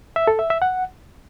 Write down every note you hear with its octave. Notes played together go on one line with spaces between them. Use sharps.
E5
A4
E5
E5
F#5